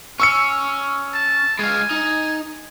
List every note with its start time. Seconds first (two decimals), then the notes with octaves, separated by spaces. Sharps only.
0.20 C#4 C#6 E6 C#7
1.14 A5
1.59 G#3 F5 G#5
1.91 D#4